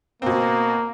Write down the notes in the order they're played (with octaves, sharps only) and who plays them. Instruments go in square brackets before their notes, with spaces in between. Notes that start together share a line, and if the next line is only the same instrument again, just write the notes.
[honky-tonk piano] B2 C4 [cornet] A#3